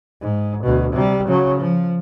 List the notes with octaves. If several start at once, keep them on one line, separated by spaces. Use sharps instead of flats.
G#2
D2 B2
C3 G3
C#3 F#3
F3